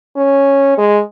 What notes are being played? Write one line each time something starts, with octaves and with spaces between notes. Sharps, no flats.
C#4
G#3